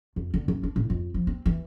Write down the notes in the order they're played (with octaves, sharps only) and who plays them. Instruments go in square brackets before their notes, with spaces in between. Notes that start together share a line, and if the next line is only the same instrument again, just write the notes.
[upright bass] F2
D3
F#2
D4
A2
F2
F3
C4
E3